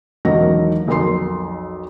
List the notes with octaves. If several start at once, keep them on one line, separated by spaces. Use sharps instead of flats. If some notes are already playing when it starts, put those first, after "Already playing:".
E1 D#3 F#3 A#3 D#4 A#6
B1 F2 A#4 C6 C7